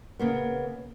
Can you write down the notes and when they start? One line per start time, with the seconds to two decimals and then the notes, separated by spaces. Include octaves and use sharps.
0.19 C#3 A#3 B3